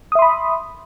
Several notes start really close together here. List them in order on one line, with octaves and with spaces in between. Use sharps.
D#6 E5 C6 B5